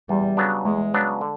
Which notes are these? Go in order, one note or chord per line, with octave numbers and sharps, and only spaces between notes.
E2 G3
C#3 F#3 B3 D4
E2 G#3
C#3 F#3 B3 D4
D3